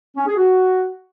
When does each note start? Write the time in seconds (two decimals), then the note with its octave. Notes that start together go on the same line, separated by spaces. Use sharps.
0.16 C#4
0.26 G#4
0.36 F#4